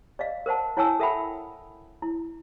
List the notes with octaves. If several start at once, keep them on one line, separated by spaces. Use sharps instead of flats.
D5 D#5 F5
A#4 C5 F#5 A5
E4 C#5 F#5 G#5 A5 E6
A4 A#4 E5 F#5 G5 B5
E4